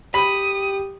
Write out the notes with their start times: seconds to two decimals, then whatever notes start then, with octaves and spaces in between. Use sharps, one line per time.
0.14 G4 B5 D#6